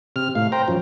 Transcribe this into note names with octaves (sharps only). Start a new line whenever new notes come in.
C3 F6
A2 F5
C5 G5 A#5
F#2 F3